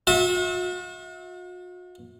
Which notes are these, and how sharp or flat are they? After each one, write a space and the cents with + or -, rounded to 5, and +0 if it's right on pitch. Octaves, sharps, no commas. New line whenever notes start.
F#4 -45 E5 -25